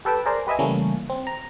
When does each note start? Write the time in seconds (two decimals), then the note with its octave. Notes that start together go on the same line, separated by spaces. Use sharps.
0.05 G4 A4 B4 G5 A5
0.26 G#4 A#4 C5 D5
0.47 G4 B4 D#5 E5 G#5
0.59 C#3 E3 G3 A3 A#3 C#4
1.10 C4
1.27 A#5